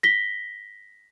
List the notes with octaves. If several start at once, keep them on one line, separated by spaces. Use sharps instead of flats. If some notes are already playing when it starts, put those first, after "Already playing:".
A#6 B6 G7